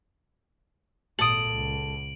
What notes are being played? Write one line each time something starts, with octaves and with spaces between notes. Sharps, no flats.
G#1 A#2 A4 D#6 D7 F#7
C#2